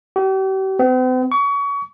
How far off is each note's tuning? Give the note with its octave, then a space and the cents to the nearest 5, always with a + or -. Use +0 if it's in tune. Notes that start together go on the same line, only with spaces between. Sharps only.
G4 -40
C4 -45
C#6 +30